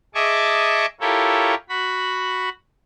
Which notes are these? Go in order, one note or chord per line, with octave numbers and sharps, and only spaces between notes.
G#4 D#5 E5 A5 C#6 D6
E4 F4 G4 A4 A#4 C#5
F#4 B5